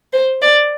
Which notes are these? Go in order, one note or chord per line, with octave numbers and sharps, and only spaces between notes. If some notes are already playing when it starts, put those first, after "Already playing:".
C5
D5